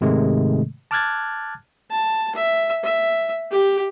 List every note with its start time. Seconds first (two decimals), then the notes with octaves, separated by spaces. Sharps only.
0.01 G#2 C3 D#3 G#3 A3
0.91 A5 D6 F6 F#6 G#6 A6
1.91 A5
2.35 E5
2.84 E5
3.52 G4